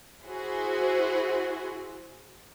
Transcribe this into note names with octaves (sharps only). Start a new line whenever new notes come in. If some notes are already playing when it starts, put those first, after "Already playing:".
E4 F#4 G#4 C5